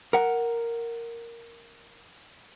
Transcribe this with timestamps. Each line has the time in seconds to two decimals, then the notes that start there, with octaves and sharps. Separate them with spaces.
0.13 A#4 F#5